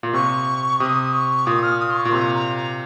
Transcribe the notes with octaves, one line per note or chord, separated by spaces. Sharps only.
A#2
C3 C#6
C3 D#6
C#6
A#2 D#6
F6
D#6
C6
C#6
A#2
C3 A#5
A#5
A#5